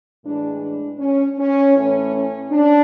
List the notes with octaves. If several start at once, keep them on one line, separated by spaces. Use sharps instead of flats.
A2 E3 G#3 D4
D4
C#4
C#4
A2 E3 A3 C#4
C#4
D4